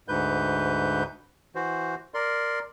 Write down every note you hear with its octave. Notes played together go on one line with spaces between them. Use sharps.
D2 G#2 B4 G6
E3 F#4 C5
A#4 D5 C6